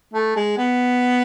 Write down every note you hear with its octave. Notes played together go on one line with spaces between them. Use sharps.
A3
G#3
B3